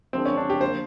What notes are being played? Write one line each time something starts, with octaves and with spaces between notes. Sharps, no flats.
D3 F3 G#3 C4
C#4
D4
G4
D3 F3 A#3 C5